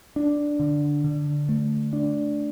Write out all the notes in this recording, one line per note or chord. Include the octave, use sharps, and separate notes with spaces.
D4
D3
D3
A3
D4